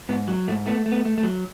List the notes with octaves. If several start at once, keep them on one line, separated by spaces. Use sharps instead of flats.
G#2 B3
F#3
G#2 A3
A3 B3
A3
B3
A3
A3
F#3